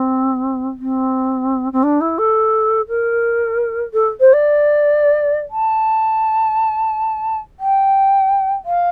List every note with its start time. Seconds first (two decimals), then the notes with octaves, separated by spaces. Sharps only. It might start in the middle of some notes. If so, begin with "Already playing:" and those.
Already playing: C4
0.79 C4
1.72 C4
1.83 D4
2.01 E4
2.18 A4
2.88 A#4
3.93 A4
4.20 C5
4.33 D5
5.50 A5
7.59 G5
8.65 F5